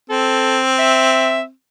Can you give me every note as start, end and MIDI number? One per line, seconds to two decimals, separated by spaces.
0.10 1.50 60
0.10 0.59 69
0.79 1.41 76